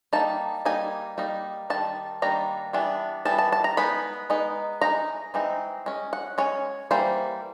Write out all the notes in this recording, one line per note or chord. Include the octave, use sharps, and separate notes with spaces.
G3 A#3 D#4 A5
G3 A#3 D#4 G#5
G3 A#3 D#4
D#3 G3 A5
D#3 G3 A#3 D4 A#5
E3 G3 B3 D4
E3 G3 B3 A5
A5
A5
A#5
G#3 B3 D#4 B5
G#3 B3 D#4
E3 G#3 C4 D#4 A#5
E3 G#3 C4 D#4
G#3 C#4
F#5
G#3 C#4 C#5
E3 G3 A#3 C5